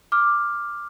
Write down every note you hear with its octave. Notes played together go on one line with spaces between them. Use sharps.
D6 F6